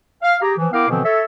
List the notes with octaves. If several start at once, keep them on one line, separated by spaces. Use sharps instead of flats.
F5
G4 G#4 A#5
E3 F3
B3 E4 A#4 F5 G5 D6
B2 D3 E3 F3 B3 C4
A4 C#5 E5